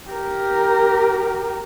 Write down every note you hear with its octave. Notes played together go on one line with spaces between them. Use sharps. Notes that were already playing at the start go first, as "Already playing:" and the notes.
G4 A#4